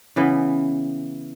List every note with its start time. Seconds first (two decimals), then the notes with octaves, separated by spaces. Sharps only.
0.16 C#3 E3 B3